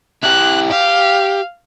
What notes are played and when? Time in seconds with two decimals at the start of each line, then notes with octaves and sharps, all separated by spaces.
0.23 E4 G4 F#6
0.70 G4 F5